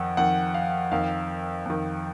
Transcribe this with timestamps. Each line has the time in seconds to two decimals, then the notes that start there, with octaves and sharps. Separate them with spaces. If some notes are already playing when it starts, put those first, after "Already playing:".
Already playing: F2 D#3 F#5
0.17 F2 D#3 F#5
0.54 F5
0.92 F2 D#3 F5
1.66 F2 D#3